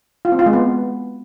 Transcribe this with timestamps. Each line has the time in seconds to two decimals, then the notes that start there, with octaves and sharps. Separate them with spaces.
0.25 F4
0.32 C4
0.39 F4
0.46 G#3
0.53 B3